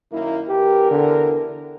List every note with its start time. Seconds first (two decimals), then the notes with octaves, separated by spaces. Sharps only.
0.12 F#2 D#3 A#3 E4
0.48 E2 E3 G4 A#4
0.91 D3